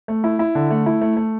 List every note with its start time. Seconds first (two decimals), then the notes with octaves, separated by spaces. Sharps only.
0.08 A3
0.24 E4
0.39 E4
0.55 D3
0.70 A3
0.86 E4
1.01 A3
1.17 A3